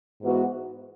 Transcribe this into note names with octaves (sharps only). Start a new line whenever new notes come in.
G#2 E3 B3 F#4